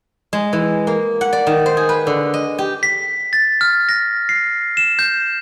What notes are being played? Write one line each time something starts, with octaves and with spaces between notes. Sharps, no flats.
G#3
E3
A#3
F#5
D5
D#3
C5
G#4
B4
D3
D#5
G4
B6
A6
F6
A#6
C7
E7
G6